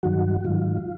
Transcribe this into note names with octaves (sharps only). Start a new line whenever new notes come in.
G2 D#3 F#3 F#4
F#4
G#2 D#3 F#3 F4